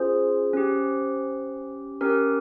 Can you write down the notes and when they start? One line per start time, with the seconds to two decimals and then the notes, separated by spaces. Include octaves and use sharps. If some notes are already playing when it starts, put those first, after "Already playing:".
Already playing: C#4 F4 G#4 C5
0.53 C#4 G4
2.01 C#4 G4 A#4